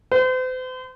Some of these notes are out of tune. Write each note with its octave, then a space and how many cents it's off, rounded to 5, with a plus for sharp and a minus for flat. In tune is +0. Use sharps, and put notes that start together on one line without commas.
C5 -40